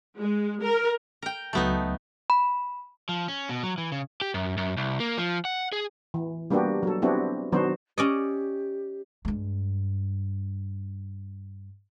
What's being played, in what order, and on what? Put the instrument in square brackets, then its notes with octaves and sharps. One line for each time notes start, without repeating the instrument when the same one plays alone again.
[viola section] G#3
A#4
[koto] A#4 G5
[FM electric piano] C#2 F#3 A5 [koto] A3 B3 D#4
[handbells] B5
[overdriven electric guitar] F3
C#4
B2
F#3
E3
C#3
G4
F#2
F#2
C2
A#3
F3
F#5
G#4
[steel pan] E3
G3 A#3 B3 D4 F#4 G4
F#3 A4
B3 C4 D4 E4 F#4 G4
D#3 F#3 B3 D4 F#4 C5
[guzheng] C#4 D5 D#5 [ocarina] G4
[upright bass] G2 G#3